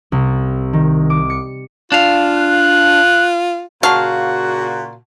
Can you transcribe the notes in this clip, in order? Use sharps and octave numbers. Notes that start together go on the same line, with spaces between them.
C2
D#3
D6
C#7
D4 F4 F5
F#6
A#2 C#3 F#4 F5 F#5 A5 C#6